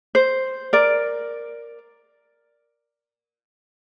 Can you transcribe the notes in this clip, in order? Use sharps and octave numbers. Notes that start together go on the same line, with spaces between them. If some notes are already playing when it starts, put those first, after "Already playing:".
C5
A#4 D5